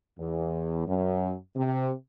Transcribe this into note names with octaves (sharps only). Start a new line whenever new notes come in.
E2
F#2
C3